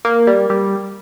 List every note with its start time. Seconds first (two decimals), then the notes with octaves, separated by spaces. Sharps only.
0.05 A#3
0.27 G3
0.50 G3